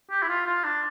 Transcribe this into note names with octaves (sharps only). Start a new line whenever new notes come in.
G4
E4
F4
F4
D4